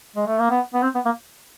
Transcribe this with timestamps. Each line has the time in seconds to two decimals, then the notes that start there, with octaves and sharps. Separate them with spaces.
0.16 G#3
0.27 A3
0.39 A#3
0.50 B3
0.74 B3
0.83 C4
0.95 B3
1.05 A#3